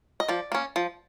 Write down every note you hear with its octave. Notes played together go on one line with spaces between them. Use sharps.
D#5
F3 D5
A#3 C#4
F3